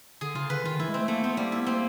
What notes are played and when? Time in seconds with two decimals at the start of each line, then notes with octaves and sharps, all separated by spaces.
0.21 D3 G#4
0.35 C#3 F4
0.50 D3 B4
0.64 D#3 F4
0.79 E3 E4
0.88 G#3
0.94 A3 C4
1.08 A3 A#3
1.23 B3 C4
1.37 G3 A#3
1.52 A#3 E4
1.61 B3
1.67 A#3 C4